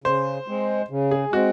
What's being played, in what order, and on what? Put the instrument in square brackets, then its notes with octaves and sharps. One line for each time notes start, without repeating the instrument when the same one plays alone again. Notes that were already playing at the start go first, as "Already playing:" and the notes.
[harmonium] C#3 [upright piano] C5
[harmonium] G#3 C4
C#3
[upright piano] G#4
[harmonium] G#3 C4 [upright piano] F#4